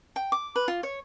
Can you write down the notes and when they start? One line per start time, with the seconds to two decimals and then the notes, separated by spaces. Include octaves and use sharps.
0.16 G5
0.32 D6
0.56 B4
0.68 F4
0.83 C#5